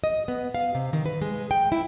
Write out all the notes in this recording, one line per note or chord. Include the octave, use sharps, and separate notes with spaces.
D#5
B3
F5
C3
D#3
B4
G#3
G5
E4